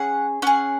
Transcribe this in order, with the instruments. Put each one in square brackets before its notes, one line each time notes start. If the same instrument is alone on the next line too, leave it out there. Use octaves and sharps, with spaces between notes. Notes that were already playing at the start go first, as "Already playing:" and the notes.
Already playing: [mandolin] C#4 G#4 F#5
C#4 G#4 F#5